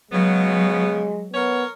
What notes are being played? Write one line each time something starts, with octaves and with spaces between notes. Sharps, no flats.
C#3 F#3 G#3 B3
B3 A#4 C#5